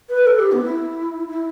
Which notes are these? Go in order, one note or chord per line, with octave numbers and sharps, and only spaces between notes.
B4
A4
G4
B3
E4
E4